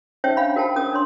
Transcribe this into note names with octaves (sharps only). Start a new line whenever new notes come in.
C#4 D#4 C5 C#5 E5 G5
D4 F5 B5
F#4 A#4 C5 G5 A5
C#4 A#4 D#6
D4 C#5 C6